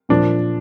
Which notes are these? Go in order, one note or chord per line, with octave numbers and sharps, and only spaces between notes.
A#2 F3 D4